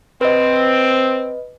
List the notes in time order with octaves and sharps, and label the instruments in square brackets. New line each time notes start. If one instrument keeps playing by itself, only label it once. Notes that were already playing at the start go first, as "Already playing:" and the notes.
[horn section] C4 [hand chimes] B4 D#5